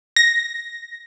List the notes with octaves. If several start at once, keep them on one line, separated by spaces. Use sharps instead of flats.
A#6